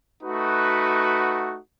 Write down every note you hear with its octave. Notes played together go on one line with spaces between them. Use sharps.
A3 D#4 F#4 B4